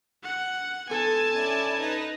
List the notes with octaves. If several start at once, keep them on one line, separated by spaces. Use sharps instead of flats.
F#5
G#2 B3 A4 G#5 A5
C#4 E4 D5
D#4 B4